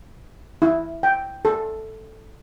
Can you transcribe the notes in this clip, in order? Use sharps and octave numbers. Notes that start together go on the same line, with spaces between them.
E4
G5
A4